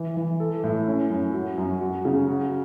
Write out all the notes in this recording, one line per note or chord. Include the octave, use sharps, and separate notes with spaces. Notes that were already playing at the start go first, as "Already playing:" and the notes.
Already playing: E3
E3
A4
A2
C#4
F#2
F#4
F#2
F#4
C#3
F#4